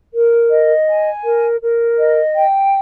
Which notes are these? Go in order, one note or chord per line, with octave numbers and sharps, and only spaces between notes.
A#4
D#5
G#5
A#4
A#4
D#5
G5